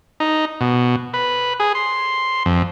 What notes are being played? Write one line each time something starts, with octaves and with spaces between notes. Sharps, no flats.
D#4
B2
B4
G#4
C6
F2